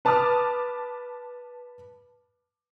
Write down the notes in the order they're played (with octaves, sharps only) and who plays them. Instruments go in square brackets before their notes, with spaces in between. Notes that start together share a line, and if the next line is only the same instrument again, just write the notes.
[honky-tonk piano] B4 A5 D6 D#6 F6